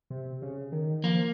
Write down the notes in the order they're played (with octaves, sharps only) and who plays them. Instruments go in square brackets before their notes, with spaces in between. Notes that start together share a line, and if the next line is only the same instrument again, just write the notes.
[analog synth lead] C3
C#3
D#3
[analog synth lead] F3 [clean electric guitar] A#3